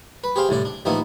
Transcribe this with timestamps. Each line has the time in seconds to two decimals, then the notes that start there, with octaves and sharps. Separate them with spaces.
0.24 B4
0.36 G4 G#4 C5 F5 G5
0.49 C2 A2 D3 D5
0.65 D4
0.85 A1 D#3 F3 A#3 B3 E4